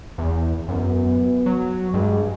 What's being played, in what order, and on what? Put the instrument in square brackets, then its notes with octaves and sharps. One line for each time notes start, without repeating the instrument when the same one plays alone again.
[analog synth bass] E2
[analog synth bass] F#2 [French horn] B3
[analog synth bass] F#3
[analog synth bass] G2 [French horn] G#3